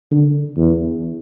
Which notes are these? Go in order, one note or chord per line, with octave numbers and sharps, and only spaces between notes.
D3
E2